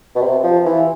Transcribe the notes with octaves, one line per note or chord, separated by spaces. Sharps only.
B2
C3
F3
E3